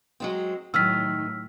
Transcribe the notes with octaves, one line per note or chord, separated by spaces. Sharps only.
F#3 G#3 C4
A2 D#3 F#3 E6 F6 B6